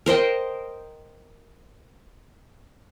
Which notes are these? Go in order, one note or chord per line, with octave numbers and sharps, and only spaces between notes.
A#4 C5 D#5 G5